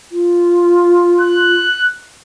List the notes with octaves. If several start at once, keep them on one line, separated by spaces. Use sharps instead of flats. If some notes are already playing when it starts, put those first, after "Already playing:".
F4
F#6